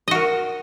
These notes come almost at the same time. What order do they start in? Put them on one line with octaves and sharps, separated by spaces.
D#5 F#4 A#4